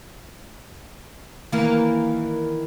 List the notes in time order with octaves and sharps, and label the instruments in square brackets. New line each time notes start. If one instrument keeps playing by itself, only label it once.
[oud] D#3 E3 A#3